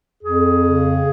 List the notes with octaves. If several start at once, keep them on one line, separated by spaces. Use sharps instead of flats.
F2 G#4
C#3